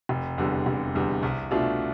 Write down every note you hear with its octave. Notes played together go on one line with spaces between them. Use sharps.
F1
E2 D3 G3
F1
E2 D3 G3
C2
B2 A3 D4 F4